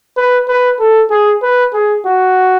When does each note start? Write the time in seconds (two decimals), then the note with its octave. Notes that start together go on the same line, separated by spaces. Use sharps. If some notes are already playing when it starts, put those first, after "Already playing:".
0.17 B4
0.48 B4
0.80 A4
1.10 G#4
1.42 B4
1.73 G#4
2.05 F#4